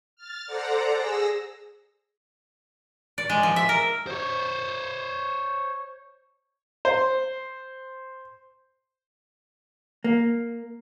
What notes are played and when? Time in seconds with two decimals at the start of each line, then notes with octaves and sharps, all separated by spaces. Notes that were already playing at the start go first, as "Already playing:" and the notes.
0.16 F6 A6
0.47 A4 C5 D5 F#5 A#5
0.95 G#4 E6 A#6
3.18 D5
3.29 G#3
3.43 F3
3.56 E5
3.69 A#4
4.07 C5 C#5
6.85 C5
10.04 A#3